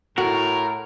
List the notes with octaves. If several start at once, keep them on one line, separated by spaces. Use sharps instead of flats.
A2 F#4 A#4